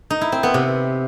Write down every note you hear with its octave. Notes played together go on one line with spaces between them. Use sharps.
D#4
E4
C4
B3
C3